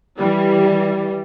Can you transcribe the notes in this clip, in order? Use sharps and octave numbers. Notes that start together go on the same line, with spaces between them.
E3 G3